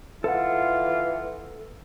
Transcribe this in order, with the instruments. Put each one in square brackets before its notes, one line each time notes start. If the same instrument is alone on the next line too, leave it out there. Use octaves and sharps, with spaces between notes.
[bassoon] E3 [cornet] F4 [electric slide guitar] A4 F#5